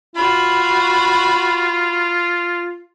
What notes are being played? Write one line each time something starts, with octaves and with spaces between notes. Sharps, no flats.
F4 F#4 B5